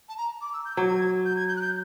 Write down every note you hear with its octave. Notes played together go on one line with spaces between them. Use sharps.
A5
A#5
D6
E6
G6
F#3 G#6
G6
G#6
G6
F#6
G6